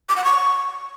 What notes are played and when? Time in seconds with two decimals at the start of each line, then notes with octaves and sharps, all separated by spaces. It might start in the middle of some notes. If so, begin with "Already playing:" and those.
0.09 D6
0.17 F#5
0.24 C#6